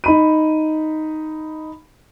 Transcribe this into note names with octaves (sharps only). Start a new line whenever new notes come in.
D#4 B5 D#7